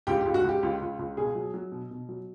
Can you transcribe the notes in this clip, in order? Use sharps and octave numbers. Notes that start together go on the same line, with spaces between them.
C#2 G4
G4
C#2
F#4
C#2 G4
C#2
C#2
C#2
B2 G#4
F#3
F#3
B2
B2
F#3